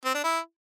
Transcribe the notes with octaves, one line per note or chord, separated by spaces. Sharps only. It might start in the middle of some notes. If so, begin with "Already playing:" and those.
C4
D4
E4